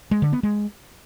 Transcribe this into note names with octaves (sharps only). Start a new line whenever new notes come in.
G#3
D3
B3
G#3